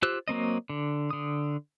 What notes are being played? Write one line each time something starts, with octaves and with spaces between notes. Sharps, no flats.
F4 G4 C5 E6 F#6
F#3 A#3 C4 D#5
D3
D3 D#6